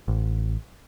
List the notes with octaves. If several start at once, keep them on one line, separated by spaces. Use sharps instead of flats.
A1